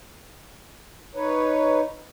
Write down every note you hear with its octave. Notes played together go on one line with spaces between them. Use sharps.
D#4 B4 C#5